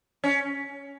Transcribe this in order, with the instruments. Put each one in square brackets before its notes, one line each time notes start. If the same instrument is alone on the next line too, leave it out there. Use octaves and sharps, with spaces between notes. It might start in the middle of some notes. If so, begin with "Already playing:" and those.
[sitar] C#4